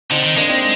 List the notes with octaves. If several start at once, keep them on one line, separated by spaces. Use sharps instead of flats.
D3 C4 D#4
D#3
G#3 A#3 D4
C4 D#4